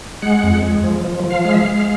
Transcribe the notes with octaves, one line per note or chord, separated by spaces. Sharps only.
G#3 F#5
F2
G#3
F3
F3
F3
F5
G#3
E5
F5
G#3